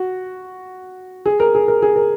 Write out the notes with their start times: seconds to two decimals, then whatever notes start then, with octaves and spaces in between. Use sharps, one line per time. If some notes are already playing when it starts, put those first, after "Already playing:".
Already playing: F#4
1.26 G#4
1.40 A#4
1.54 G#4
1.68 A#4
1.82 G#4
1.96 A#4